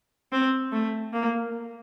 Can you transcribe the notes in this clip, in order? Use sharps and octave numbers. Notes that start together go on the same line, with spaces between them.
C4
A3
A#3